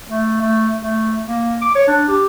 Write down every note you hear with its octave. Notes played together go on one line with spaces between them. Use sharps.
A3
A3
A3
A#3
D6
C#5
D4
G4